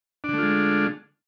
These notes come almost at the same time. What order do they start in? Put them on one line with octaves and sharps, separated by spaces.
D4 D3 A3 F4 G#3